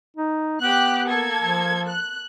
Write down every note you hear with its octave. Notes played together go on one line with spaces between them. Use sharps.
D#4
B3 G4 F#6
A#3 A4 G#6
F3
F#6